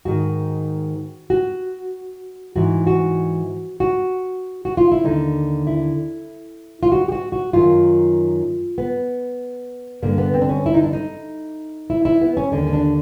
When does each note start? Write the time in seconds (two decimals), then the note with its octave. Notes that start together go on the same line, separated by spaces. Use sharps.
0.05 G#2 D#3 F#4
1.30 F#4
2.56 G#2 E3 F#4
2.87 F#4
3.80 F#4
4.65 F#4
4.77 F4
4.92 E4
5.05 D#2 D3 D#4
5.67 E4
6.83 F4
6.92 F#4
7.08 G4
7.12 F#4
7.32 F#4
7.53 F#2 D#3 F4
8.78 B3
10.02 G2 D3 A#3
10.18 B3
10.34 C4
10.42 D4
10.49 C#4
10.66 E4
10.74 D#4
10.84 D4
10.93 D#4
11.90 E4
12.05 E4
12.21 B3
12.37 C#4
12.52 D#2 D3 D4
12.67 C#4
12.73 D4